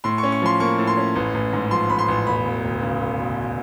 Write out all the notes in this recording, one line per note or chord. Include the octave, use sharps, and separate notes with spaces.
A2 C6
C#4 C#6
C#6
F3 C6
A#3 C#6
A2
C6
C#4
A1
A1
G#2
F3 C6
A1 B5
C6
A1
E1 B5
E1
D2
C#3
E1
E1